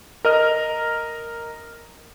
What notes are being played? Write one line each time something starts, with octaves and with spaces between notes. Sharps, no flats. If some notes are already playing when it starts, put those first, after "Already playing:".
A#4 D#5 F6